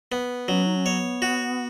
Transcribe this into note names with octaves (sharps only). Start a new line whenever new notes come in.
B3
F#3 C#4
D#4
C#4
B3 C#5
F#4